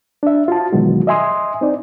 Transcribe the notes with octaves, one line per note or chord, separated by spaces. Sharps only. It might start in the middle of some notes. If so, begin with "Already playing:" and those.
D4 E5
F4 F#4 A5
B2 D#3 E3 F#3 G#3 F#4
D#5 E5 G#5 C6 D#6
C4 D#4 D5